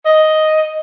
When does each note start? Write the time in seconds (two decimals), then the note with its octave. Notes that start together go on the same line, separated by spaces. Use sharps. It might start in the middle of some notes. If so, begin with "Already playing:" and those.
0.06 D#5